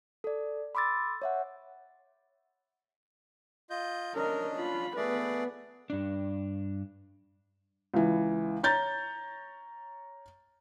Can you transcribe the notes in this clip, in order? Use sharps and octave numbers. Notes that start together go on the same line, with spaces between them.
A4 D5
B5 C6 D6 E6 A6
C#5 E5 F#5
F4 D#5 G6
C#4 D4 A#4 D#5
F4 B5
A3 B3 G#4 B4 D5
G2 D4
C#2 E3
C#5 A#5 G6 A6